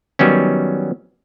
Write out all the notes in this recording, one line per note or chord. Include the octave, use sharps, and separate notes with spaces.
D#3 F#3 G3 B3 C#4